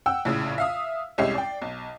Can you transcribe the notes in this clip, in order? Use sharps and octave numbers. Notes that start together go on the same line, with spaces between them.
F#5 G5 E6
A#1 A2 C#3
E5 F5 D#6
C2 G#3 C#4 G4 E5 C7
D5 G5
B1